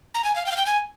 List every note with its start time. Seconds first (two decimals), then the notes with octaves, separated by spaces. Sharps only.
0.14 A#5
0.24 G#5
0.35 F5
0.46 G5
0.51 F5
0.57 G5
0.66 G#5